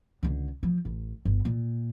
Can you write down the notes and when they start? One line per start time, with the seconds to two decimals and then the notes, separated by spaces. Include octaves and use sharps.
0.23 C#2 D3
0.63 F3
0.85 A1
1.25 G1
1.45 A#2